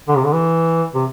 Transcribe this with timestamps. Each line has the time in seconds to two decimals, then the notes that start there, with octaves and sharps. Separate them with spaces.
0.08 D3
0.16 C3
0.25 D3
0.33 E3
0.94 C3